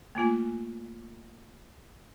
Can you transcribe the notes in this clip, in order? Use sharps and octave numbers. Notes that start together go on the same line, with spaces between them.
A3 A#3 F4 G#5